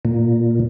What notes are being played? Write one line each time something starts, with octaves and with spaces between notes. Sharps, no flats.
A#2